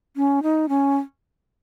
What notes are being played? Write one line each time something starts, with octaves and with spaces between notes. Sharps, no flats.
C#4
D#4
C#4